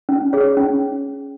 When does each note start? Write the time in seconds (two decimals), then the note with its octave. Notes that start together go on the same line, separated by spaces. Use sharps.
0.09 C#4
0.33 G#4 C#5
0.57 C#4